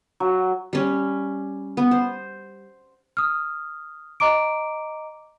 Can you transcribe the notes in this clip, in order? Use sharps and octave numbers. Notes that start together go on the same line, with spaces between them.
F#3
G3 C#4
B3
C5
D#6 F6
D#5 A#5 D6 D7